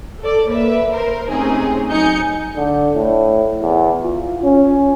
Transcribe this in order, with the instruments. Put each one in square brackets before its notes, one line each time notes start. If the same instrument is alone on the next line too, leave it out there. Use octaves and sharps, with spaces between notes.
[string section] A4 D5
A#3 B4 E5
A#4 C5
A2 C3 C4 C#4 D#4 G#4
F#3 D#4 G#5 G6 C#7
[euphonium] D3
A2
E2
F4
C#4